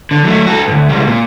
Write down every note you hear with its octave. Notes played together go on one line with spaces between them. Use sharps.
D3
F#3 A3
F#4 A4
D2 G2
C#2 G3
A#2